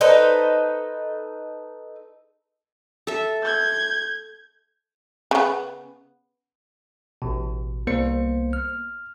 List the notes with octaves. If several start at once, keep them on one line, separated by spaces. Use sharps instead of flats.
D#4 A4 B4 C5
A4 E5
G6 G#6
C#3 B3
A1 B2
C2 A#3 B3 C5 C#7
F6